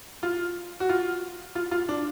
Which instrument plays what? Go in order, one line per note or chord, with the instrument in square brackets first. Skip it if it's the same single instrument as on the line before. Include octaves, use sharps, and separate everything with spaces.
[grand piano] F4
F#4
F4
F4
F4
D4